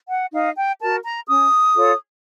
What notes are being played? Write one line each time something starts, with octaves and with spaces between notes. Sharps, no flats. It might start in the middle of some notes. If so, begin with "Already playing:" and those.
F#5
D#4 F5
G5
F#4 A#4 A5
A#5
C#4 D#6
F4 A4 C#5